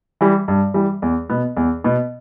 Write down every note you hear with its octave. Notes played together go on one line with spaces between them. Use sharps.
E3 G3
G2
E3 G3
E2
B2 B3
E2
B2 B3